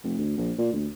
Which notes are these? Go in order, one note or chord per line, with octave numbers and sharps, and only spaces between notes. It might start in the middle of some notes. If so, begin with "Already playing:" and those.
F1
D2
A#1
A#2
D2